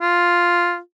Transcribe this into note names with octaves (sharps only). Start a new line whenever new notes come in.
F4